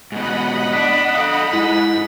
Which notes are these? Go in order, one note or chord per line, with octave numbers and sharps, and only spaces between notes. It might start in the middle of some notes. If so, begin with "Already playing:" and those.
G#2 B2 D#5 F#5 B5
D4 B6
A4 F5 D#6
G#2 E4